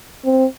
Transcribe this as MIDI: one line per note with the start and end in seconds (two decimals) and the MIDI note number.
0.25 0.45 60